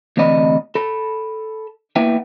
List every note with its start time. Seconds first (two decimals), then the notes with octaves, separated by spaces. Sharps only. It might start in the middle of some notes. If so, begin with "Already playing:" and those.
0.17 D2 C3 E3 D5 D#5 B5
0.75 A4 B5
1.96 A#3 B3 E4 B4 E5 G5